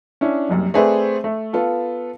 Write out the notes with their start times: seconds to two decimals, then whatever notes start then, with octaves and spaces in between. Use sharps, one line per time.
0.21 C#4 D4 E4
0.49 F#1 C2 F#2
0.74 A3 C4 G#4 B4 C5 D5
1.24 A3
1.53 B3 F4 A4